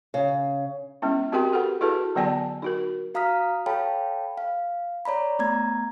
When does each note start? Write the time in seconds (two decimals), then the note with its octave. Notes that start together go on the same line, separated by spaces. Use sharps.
0.14 C#3
1.02 G#3 B3 C#4 E4
1.32 C4 F#4 G4 A#4 G5 C6
1.52 G4 A4 B4 F#5
1.81 E4 F#4 G#4 A4 B4 A5
2.15 D3 F#3 B3 D5 G#5 A5
2.62 D#4 F#4 A#4
3.14 F#4 F5 A#5 D#6 F6 B6
3.66 A4 C#5 F5 G5 A5 B5
4.38 F5
5.05 C#5 D5 A#5 B5
5.39 A3 B3 A#5 G#6